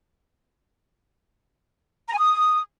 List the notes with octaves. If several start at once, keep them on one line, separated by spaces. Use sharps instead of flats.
A#5
G#5
D#6